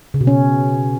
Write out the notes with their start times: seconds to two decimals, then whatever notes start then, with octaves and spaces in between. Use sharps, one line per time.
0.14 C#3
0.21 B2
0.27 C#4